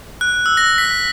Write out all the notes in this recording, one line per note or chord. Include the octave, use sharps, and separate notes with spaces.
F#6
E6
A#6
B6